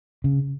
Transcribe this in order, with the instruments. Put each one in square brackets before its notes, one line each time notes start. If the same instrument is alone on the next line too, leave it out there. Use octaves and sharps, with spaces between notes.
[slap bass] C#3